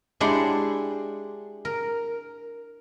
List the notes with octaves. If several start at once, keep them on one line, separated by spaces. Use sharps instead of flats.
G#3 D4 E4 G4 F#5 C6
A#4